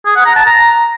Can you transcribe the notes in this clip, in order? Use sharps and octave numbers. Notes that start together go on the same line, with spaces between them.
G#4
F#5
A#5
A5
A#5